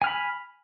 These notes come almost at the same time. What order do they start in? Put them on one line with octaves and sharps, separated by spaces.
G#5 F6 B5